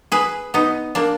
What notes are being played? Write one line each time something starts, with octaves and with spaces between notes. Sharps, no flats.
G#4 B4
B3 D#4
A#3 D4